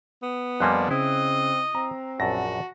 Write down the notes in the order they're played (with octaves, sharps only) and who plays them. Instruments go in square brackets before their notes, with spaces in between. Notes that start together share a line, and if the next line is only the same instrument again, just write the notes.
[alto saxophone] B3
[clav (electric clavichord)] F2 G3 A#3 [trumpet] D4 [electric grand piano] G#5 C6 F#6
[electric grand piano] C#3 [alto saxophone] C4 [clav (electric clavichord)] E4 [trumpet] D#5
[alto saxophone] C4 [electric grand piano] A#5
[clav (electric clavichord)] A#1 F#2 [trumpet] F#4 [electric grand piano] A5 A#6